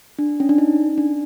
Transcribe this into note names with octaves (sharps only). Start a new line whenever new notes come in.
D4
C#4
D4
D#4
D4